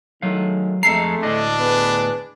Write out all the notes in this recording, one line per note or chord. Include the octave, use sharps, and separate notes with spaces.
D#3 F#3 G#3 A3 F5
F2 G#3 A3 A4 A#5 C7
D2 A2 D4 D#5
B3 G#4 B4